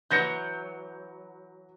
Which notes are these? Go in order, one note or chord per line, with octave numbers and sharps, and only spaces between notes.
E3 F#3 G6 A#6 C#7